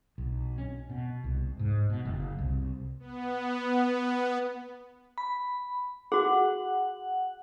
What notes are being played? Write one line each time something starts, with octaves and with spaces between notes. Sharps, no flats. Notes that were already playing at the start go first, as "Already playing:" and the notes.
B1
C#4
B2
C2
G#2
B2
F#1
C2
B3
B5
F#4 G#4 F#5